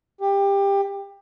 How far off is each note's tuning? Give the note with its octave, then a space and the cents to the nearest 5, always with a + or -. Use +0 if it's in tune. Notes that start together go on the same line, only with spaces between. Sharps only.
G4 +20